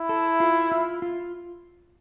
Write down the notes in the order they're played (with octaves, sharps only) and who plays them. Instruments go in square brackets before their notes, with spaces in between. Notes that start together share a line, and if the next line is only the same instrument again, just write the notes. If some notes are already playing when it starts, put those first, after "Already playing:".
Already playing: [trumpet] E4
[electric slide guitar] A4
F4
F4
F4